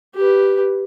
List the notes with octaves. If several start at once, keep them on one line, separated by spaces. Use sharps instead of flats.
G4 B4